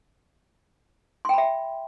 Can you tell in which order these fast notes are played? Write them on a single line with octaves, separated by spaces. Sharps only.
C6 G5 B5 E5